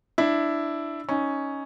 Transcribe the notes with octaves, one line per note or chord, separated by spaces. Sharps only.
D4 E4
C#4 D#4